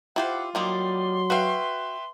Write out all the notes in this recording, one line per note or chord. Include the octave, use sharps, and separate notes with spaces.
E4 F4 G4 C5 F#5
D#3 F#3 G3 A#3 C6
F#4 B4 E5 F5 G5